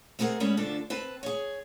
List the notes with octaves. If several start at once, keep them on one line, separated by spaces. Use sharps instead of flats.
A3 C4 G#4 A#4 F#5
G3 G#3 B3 C#4
D2 D3 D4 F4 A4
C4 B4 A5
G#4 C#5